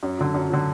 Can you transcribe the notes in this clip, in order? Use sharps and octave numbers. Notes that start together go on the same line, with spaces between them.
F#2
D3 F#3
F#2
D3 F#3